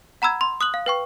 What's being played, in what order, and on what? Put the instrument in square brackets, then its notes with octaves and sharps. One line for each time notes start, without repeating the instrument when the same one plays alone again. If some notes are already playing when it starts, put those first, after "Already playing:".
[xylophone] F#5 A#5 B5 E6 G#6
C6
D#6 F#6 F#7
F5
B4 G5 C#6